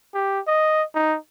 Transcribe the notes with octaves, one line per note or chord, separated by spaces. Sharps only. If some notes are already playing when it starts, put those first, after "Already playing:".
G4
D#5
D#4